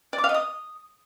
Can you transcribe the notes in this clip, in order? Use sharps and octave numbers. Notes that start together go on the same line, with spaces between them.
D5
D6
F5
D#5
D#6